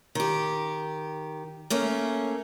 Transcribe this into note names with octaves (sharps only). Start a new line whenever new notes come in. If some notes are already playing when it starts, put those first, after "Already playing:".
D#3 G4
A3 A#3 C#4